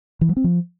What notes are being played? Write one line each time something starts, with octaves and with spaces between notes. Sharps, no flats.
E3
F#3
C4
F3